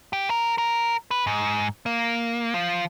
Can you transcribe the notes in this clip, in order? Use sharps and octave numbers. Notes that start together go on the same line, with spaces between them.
G4
A#4
A#4
B4
G#2
A#3
F3